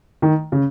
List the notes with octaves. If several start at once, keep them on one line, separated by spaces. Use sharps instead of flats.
D#3
C#3